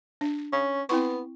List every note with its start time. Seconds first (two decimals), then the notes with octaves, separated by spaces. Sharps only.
0.21 D4
0.53 C#4
0.89 B3 C4 E4 C#6